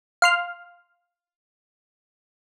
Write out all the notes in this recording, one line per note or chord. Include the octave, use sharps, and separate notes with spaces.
F5 C6 F6